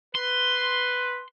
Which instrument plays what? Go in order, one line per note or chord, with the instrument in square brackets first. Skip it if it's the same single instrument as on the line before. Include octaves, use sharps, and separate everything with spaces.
[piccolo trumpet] B4 [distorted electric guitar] C6